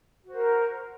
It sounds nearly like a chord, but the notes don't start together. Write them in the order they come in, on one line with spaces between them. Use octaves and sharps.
F#4 C5 A#4